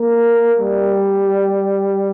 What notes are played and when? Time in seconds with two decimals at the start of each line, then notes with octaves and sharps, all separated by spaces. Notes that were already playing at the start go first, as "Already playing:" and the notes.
Already playing: A#3
0.59 G3